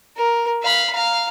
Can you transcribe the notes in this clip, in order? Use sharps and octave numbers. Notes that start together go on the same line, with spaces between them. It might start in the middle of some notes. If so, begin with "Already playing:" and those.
A#4
F5 B5
F5 A#5